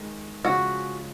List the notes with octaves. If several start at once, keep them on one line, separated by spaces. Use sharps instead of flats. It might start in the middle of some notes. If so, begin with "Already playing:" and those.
Already playing: D#3 G#3
C#3 F3 G#3 F#4